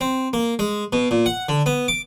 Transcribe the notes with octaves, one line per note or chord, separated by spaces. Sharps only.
C4
A#3
G#3
B2
A#2
F#5
D3
B3
D6